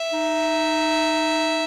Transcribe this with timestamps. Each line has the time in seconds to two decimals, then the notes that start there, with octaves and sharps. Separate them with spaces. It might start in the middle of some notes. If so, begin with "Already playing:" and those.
Already playing: E5
0.13 D#4